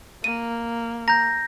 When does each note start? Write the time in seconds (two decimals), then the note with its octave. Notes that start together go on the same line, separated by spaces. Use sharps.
0.24 A#3 D#7
1.08 A#5 G6 A#6